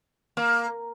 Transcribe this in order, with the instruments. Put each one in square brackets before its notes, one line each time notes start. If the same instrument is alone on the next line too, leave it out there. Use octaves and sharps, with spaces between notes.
[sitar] A#3